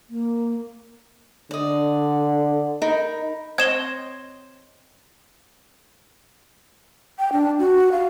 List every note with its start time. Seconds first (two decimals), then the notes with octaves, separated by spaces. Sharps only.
0.10 A#3
1.51 D3 D5 D#5
2.82 D#4 A#4 B5
3.58 C4 C#5 D#5 G#6 E7 G7
7.19 G5
7.32 D4
7.59 F#4
7.92 F5